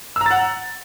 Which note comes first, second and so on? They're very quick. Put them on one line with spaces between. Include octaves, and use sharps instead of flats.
E6 A#5 A6 F#5